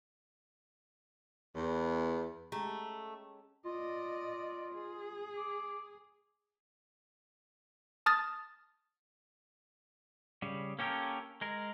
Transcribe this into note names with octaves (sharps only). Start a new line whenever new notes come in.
E2
G#3 A3 C#4 G4 A#5
F4 D5 D#5
G#4
D6
A5 D#6 F6 A6
C#3 G3
A#3 C#4 G4 A4 A#4
G#3 A#4